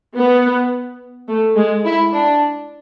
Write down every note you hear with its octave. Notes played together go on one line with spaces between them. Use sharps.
B3
A3
G#3
E4
D4